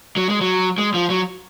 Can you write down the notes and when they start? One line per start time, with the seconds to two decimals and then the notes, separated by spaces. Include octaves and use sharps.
0.17 F#3
0.29 G#3
0.41 F#3
0.78 G#3
0.94 F3
1.10 F#3